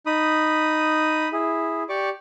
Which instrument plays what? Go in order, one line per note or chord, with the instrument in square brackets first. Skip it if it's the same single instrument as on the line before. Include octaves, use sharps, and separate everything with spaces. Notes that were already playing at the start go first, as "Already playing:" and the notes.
[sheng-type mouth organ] D#4 B5 D#6
E4 G#4
G4 D5 C#6 D6